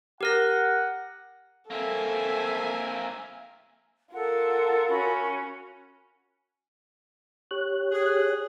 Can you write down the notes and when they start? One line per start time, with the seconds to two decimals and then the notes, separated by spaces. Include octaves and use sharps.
0.21 G4 A#4 F#5 A#6
1.71 A#3 C4 A4 E5 G#5
4.14 F4 A4 A#4 F#5
4.90 C#4 F#4 B5
7.51 G4 C#5 F#6
7.92 G#4